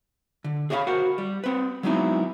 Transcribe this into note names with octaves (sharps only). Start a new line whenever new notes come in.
D3
G#4 C#5 D5 E5 F5 B5
F#4 A#4 C5 F#5
G3
C4 B4
F#3 G#3 B3 C4 D#4 E4